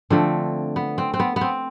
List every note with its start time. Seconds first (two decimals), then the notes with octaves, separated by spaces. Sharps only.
0.10 D3 F3 A3 C4
0.76 B3
0.98 C4
1.14 C4
1.20 B3
1.36 B3
1.41 C4